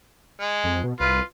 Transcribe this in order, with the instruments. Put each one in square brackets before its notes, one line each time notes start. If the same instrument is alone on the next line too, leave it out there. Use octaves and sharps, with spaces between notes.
[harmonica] G#3
[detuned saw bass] F2
B2
[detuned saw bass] C2 [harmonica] F4 B4